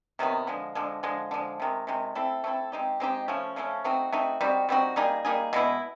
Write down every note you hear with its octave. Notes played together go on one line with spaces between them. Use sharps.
C3 D#3 F#3 B3
D3 F3 G#3
D3 F3 G#3
D3 F3 G#3
D3 F3 G#3
C3 D#3 G#3
C3 D#3 G#3
A3 C4 E4 A4
A3 C4 E4 A4
G#3 C4 D#4 G4
G#3 C4 D#4 G4
C#3 F3 A3 C#4
C#3 F3 A3 C#4
A3 C4 D#4 F#4
A3 C4 D#4 F#4
G3 C4 D#4 F#4
G3 C4 D#4 F#4
G3 A#3 D#4 G#4
G3 A#3 D#4 G#4
B2 G#3 B3 E4